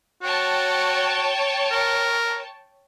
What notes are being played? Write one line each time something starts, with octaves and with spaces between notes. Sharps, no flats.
F#4 C#5 G5 A5
A#4